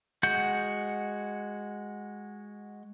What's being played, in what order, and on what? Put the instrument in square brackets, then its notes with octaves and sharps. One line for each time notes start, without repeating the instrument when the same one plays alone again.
[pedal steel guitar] G#3 F#4 F#5 G6